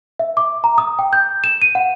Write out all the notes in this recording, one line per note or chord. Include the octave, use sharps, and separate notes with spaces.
E5
D6
A#5
D#6
G5
G6
E7
D#7
F#5